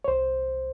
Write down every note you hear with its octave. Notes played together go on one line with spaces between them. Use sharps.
C#5
C2 C5